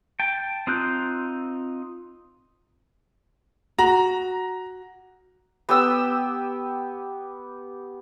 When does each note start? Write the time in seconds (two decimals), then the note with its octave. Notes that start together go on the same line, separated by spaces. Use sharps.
0.20 G5 A5
0.67 C4 D#4 F4 F#6 G6
3.78 F#4 A#5
5.69 B3 G4 D#6 E6